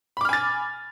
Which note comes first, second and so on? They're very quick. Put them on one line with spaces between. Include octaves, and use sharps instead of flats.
B5 D6 F6 G#5 A6